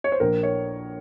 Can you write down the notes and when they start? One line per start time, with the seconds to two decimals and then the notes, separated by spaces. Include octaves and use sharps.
0.04 C#5
0.12 C5
0.20 A#1 A#4
0.43 C#5